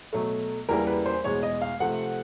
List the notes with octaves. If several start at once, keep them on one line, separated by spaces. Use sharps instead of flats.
B2 F#3 A3
E2 C#3 E3 G3 A#3 A#4
B4
C5
E2 B2 G#3 C#5
D#5
F5
C3 F3 A3 F#5